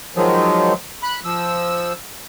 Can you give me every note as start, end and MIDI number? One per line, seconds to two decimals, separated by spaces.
0.16 0.73 51
0.16 0.73 53
0.16 0.73 54
0.16 0.73 56
1.03 1.20 83
1.03 1.20 90
1.25 1.93 53
1.25 1.93 88